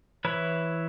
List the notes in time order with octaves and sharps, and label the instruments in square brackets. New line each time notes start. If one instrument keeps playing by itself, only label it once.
[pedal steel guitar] E3 E4 B4 C#5 B5